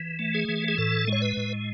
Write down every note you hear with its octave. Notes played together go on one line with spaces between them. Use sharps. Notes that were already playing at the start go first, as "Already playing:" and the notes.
Already playing: E3
A3
G#4
E3
G#4
A2 A4
G#3 C#5
B4
A2